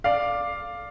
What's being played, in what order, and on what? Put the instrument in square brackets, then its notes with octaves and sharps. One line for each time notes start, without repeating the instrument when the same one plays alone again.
[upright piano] D5 F5